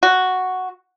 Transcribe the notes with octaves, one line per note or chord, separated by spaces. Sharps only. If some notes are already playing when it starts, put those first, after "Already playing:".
F#4